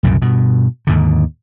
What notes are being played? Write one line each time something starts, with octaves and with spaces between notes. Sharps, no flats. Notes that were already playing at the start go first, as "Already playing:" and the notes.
C2 F#2 A#2 C#3
G2 B2
D#2 G#2 D3